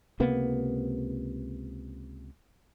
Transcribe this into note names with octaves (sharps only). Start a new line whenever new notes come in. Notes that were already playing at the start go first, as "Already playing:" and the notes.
C#2 C3 A#3 B3